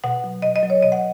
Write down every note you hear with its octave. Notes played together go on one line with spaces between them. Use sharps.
B2 F#5
F#3
B2 D#5
D#5
F#3
C#5
B2 D#5
F#5